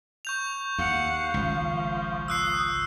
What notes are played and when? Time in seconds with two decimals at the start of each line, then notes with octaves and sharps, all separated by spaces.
0.25 C#6 G6 F7
0.78 D#2 F5 F#5
1.34 G#1 C#2 F3
2.28 D#6 E6 F#6 C7